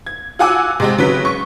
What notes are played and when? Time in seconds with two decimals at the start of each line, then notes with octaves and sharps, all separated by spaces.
0.06 G#6
0.39 F4 F#4 F#5 G#5 D6 E6
0.80 C3 G#3 C4
0.98 C#3 F#3 B4 B6
1.25 C#6